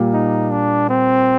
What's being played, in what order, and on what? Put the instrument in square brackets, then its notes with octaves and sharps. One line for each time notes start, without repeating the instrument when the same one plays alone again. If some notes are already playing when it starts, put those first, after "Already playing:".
Already playing: [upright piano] A#2 G3 A#3
[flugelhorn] D#4
D4
C4